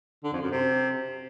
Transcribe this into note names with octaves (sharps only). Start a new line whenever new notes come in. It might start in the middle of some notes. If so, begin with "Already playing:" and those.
D3
F2
F#2
C3